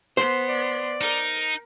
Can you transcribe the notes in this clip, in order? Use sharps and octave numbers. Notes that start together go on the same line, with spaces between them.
B3 C5 C6
D5
D#4 A#4